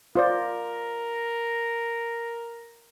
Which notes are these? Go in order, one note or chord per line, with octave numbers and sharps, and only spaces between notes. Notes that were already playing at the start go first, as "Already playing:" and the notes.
F4 A#4 C5 D5